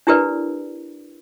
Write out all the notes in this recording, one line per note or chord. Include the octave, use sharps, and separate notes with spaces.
D4 E4 G4 A#4 B4 D5